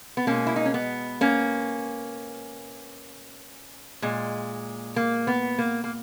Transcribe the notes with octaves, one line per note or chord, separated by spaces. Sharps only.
B3
B2 G#3 A#3 C#4
E4
D#4
C#4
B3
A#3 C#4
A#2 G#3
A#3
B3
A#3
A#3